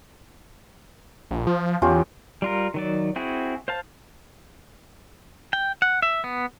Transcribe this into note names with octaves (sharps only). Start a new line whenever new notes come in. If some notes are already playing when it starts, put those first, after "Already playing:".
A#1
F3
E2 C#4 F4 G4
G3 F4 A#4
D#3 F#3 D5
C4 E4 F#4 G#4
C5 F5 A5
G5
F#5
E5
B3